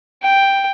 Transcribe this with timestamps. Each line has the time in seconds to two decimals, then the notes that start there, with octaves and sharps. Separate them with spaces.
0.22 G5